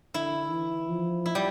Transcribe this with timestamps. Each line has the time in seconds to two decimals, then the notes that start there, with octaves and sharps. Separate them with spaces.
0.14 D3 E4
0.51 E3
0.89 F3
1.26 E4
1.35 G3